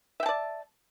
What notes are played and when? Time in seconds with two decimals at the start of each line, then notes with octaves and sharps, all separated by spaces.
0.20 E5
0.23 G5
0.26 A5
0.29 D5